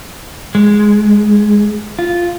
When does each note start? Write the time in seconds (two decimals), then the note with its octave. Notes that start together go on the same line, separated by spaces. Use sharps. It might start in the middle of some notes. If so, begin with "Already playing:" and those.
0.55 G#3
1.99 F4